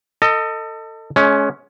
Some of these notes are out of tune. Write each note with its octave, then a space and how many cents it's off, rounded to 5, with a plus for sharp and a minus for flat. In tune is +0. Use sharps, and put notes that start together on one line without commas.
A4 +30 D#5 +0
G#3 +35 C#4 +10